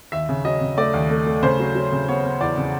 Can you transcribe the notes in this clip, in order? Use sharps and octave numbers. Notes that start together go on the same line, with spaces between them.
D#2 E5
C#3
F#3 D#5
C#3
A3 D5
D#2
A3
A3
C#3 C5
F#3
F#3
C#3
B3 C#5
B3
E2 D5
C#3